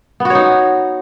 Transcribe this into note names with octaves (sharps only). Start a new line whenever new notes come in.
B3 D#4 F#4 C#5